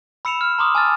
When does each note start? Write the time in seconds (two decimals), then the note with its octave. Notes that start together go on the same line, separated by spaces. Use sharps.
0.25 B5 E6 C#7 E7 F7
0.41 F6
0.58 A#5 C6 D6 D#6
0.75 G#5 A5 E6 F6 A6